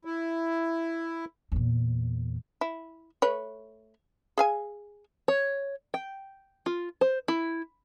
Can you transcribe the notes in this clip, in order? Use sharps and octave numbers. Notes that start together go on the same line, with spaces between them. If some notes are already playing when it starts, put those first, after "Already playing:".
E4
E2 A#2
E4
A3 B4 C#5
G#4 F5 G#5
C#5
G5
F4
C5
E4